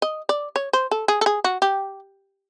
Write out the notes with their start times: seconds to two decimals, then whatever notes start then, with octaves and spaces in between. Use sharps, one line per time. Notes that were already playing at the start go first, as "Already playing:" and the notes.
0.02 D#5
0.29 D5
0.56 C#5
0.73 C5
0.91 A4
1.08 G#4
1.21 A4
1.26 G#4
1.44 F#4
1.62 G4